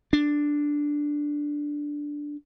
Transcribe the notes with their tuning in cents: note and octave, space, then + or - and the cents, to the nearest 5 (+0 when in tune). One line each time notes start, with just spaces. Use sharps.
D4 +0